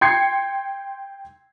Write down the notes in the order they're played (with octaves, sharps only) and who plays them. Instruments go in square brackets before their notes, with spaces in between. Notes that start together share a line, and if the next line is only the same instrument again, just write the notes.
[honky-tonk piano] G5 C6 G#6 C7 C#7